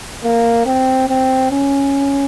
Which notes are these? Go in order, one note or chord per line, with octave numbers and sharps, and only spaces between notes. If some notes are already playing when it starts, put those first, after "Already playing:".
A#3
C4
C4
C#4